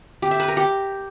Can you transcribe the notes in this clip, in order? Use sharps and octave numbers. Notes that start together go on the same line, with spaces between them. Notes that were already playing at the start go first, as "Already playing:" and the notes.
G4
E5
B4
A#4
G4